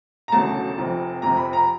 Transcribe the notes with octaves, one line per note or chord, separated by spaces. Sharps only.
A#5
E1 D2 C#3 F#3 A3 A5
F1 F2 C3
F1 F2 C3 A#5
B5
A#5